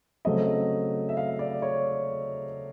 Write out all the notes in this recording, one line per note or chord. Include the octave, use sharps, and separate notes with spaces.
C#3 F#3 A3 C4 D#5
E5
F5
D5
C#5